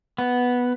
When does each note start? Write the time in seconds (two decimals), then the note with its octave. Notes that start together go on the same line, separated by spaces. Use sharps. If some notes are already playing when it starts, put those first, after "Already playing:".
0.18 B3